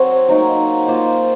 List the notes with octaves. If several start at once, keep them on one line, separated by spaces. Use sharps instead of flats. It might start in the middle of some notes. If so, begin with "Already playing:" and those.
Already playing: F#3 C4 F#4 C#5
F#3 A#3 D#4
A#3 F4 C5 D#5